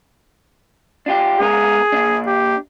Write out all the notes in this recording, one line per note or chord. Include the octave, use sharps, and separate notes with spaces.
D4 F4 G4
G#3 B3 G#4 A#4
A#2 D4
G4